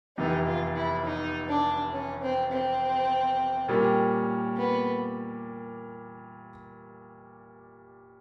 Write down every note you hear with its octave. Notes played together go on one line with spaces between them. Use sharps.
F1 E2 C3 D#4
F4
E4
D#4
D4
C#4
C4
C4
A#2 G3 A#3 C#4
B3